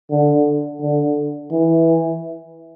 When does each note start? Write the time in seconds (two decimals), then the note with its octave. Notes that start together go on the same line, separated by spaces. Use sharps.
0.11 D3
0.81 D3
1.52 E3